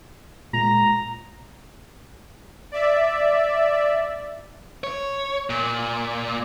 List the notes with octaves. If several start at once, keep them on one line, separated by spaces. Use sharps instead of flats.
A#2 G#3 A#5
D5 E5
C#5
A#2